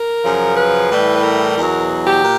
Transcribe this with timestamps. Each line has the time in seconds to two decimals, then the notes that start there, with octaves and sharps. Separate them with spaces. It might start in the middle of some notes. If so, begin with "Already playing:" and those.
Already playing: A#4
0.23 F#2 C#3 F3
0.56 B4
0.90 A2 E3 G3
1.14 B4
1.23 A#4
1.56 E2 B2 F#3
2.06 G4
2.23 A#2